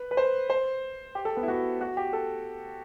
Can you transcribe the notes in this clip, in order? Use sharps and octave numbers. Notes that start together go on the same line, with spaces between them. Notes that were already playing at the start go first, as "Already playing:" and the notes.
Already playing: B4
B4
C5
C5
G4
A4
B3
E4
F#4
F#4
G4
A4